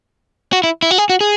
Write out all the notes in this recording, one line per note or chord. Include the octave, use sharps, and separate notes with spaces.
F#4
E4
E4
F#4
G#4
F#4
G#4